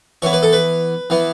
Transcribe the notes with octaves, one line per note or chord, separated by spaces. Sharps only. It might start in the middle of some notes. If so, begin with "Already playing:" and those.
E3 B3 C#5
B4
A4
B4
E3 B3